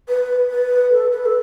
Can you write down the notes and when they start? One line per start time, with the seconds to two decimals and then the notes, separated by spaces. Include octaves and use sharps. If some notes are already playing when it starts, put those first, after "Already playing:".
0.08 B4
0.49 B4
0.91 A4
1.11 B4
1.25 A4